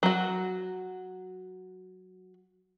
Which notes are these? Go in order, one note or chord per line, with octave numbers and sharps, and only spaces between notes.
F#3 F#4